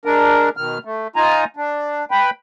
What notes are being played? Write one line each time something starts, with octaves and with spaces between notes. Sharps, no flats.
G#3 D4 A#4
B2 D#3 F6
A3
D#4 F4 G#5 A#5
D4
B4 G5 B5